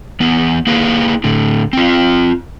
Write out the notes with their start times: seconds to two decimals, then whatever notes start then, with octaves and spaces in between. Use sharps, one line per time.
0.20 E3 B3
0.67 A#3 E4 G#4 B4
1.24 A2 D3
1.73 C4 F4